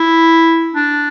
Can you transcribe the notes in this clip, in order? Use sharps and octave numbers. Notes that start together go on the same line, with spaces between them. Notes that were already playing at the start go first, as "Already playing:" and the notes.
Already playing: E4
D4